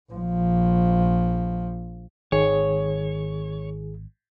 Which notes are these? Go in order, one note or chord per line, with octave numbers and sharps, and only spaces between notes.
A#1 F3
G#1 D#3 G#4 C#5